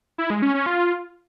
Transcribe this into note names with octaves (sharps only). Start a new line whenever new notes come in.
E4
G#3
C#4
C#4
F4